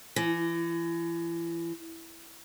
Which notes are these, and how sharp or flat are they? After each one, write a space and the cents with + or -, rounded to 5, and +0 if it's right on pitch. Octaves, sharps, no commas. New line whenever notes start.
E3 +35